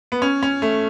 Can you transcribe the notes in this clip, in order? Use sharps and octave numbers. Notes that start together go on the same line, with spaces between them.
B3
C#4
C#4
A3